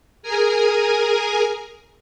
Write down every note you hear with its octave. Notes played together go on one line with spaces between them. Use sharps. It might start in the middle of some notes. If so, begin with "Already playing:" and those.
G#4 A#4 G#5